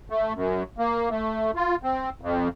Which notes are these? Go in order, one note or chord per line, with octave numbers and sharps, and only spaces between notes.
A3
F#2
A#3
A3
F4
C4
F2